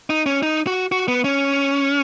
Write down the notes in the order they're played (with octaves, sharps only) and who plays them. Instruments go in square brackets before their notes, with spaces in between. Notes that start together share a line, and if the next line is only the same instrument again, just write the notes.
[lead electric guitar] D#4
C#4
D#4
F#4
F#4
B3
C#4